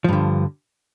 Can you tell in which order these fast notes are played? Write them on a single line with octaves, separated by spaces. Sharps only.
F3 G2 D3